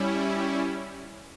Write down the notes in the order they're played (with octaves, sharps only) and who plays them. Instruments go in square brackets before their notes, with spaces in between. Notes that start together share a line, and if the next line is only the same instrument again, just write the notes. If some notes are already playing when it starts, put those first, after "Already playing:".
Already playing: [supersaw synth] G3 C#4 E4